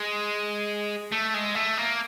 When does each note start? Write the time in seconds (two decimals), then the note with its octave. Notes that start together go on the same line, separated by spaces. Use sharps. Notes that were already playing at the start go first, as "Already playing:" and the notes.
Already playing: G#3
1.12 A3
1.35 G#3
1.55 A3
1.77 A#3